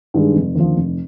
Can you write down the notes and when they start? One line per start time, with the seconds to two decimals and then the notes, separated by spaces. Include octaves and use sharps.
0.14 G2 D#3 G#3
0.35 F1
0.55 D#2 D3 F3
0.76 F1